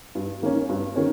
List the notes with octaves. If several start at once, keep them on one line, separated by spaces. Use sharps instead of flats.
G2
D#3 A#3 C#4
G2
D#3 A#3 C#4